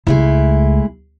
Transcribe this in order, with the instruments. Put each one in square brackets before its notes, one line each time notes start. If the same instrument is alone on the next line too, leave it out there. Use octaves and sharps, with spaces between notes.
[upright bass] C#2 [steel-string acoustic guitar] G#3 A3 E4